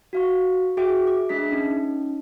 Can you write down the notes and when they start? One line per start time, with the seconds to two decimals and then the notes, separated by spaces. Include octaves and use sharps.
0.13 F#4 F5 C#6
0.77 F#4 G#4 E5 G5 D6 D7
1.07 D6
1.29 A3 D4 G#4 E5 B6
1.51 C#4 D#4